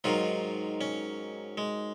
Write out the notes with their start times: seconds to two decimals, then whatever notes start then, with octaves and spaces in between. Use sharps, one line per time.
0.04 G#2 D#3 F#3 F4
0.81 C#4
1.58 G#3